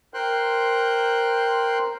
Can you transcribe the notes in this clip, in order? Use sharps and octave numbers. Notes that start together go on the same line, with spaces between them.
A#4 C5 G5 C6 F#6